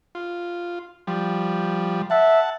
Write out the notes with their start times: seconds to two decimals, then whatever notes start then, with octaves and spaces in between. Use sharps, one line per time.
0.15 F4
1.07 F3 G3
2.11 E5 F#5 A5